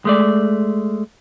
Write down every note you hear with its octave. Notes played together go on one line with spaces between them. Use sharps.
G#3 A3 D5